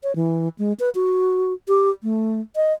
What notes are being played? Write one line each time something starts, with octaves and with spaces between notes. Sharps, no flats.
C#5
E3
G#3
B4
F#4
G4
A3
D#5